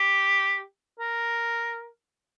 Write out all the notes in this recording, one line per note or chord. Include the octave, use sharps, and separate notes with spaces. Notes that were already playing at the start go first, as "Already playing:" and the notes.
Already playing: G4
A#4